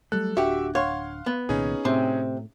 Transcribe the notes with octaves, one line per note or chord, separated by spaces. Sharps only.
F#3 G3 A3 A4 F#6
D1 D4 F#4 G4 E5
C#5 F5 F#5 C6
B3
C2 A#2 D#3 C#4 D#4 G#4
A2 C3 C4